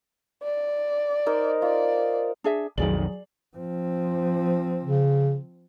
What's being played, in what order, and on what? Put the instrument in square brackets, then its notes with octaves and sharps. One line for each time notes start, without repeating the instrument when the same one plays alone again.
[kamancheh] D5
[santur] D#4 A#4 C5
[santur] F4 [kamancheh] D5
[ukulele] D4 G#4 E5
[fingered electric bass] B1 F2 D#3 [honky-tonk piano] F#3 G#4 F#7 [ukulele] D5
[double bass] F3 C4
[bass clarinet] C#3